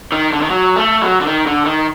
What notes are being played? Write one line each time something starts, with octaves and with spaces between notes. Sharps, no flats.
D#3
D3
D#3
F#3
A3
F#3
D3
D#3
D3
D#3